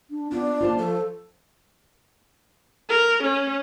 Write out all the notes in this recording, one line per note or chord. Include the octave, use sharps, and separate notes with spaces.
D4
B3 D4 F4
A#3 F4 C5 A5
F3 A4
A#4
C#4